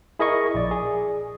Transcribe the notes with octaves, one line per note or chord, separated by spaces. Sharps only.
E4 G#4 A#4 D#5 G#5 C#6
A#1 D5
G#4